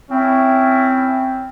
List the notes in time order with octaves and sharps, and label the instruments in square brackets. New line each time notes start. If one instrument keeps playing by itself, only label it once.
[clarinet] C4 [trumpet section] C#4 E4